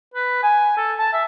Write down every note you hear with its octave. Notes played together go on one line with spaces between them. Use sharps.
B4
G#5
A4
A5
E5